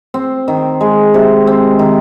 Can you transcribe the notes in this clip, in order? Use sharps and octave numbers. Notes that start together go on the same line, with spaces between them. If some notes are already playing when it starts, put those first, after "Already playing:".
C4
D#3
G#3
C3
C4
D#3